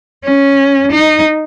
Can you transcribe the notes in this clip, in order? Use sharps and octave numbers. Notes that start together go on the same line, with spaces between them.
C#4
D#4